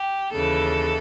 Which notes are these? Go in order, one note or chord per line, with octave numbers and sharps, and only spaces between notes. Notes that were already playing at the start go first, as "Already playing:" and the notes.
Already playing: G4
D#2 C#3 E3 A4